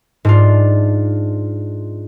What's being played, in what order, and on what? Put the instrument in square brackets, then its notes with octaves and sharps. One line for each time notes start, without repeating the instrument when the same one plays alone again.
[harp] G#2 D4 F4